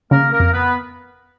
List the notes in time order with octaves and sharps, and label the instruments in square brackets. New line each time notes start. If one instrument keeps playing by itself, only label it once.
[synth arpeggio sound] C#3 [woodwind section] A#3 A#4
[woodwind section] A#3 A#4
[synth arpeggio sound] F2
[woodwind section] B3 B4